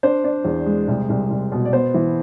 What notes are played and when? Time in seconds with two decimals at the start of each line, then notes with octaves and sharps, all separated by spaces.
0.03 D4 C5
0.24 D4
0.45 E2
0.66 G#3
0.88 C2
1.09 C2
1.30 C2
1.52 B2
1.65 D5
1.73 B3 C5
1.94 E3